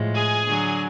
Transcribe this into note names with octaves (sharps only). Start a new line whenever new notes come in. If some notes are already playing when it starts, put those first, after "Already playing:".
Already playing: A2 F3 G#3
G#4 G#5
D3 F#3